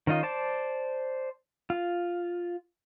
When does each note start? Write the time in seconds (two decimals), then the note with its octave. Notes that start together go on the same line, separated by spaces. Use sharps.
0.07 D#3 C#4 D#4 F4 D#5
0.23 C5 D5 A5
1.70 F4